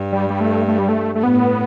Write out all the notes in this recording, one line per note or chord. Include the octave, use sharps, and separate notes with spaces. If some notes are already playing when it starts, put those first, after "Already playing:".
Already playing: G2
G3
G3
A3
A3
G3
A3
A3
A2 B3